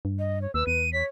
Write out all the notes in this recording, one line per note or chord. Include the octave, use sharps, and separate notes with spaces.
G2
D#5
C#5
D#2 B4 E6
E2 D#7
C#5 B6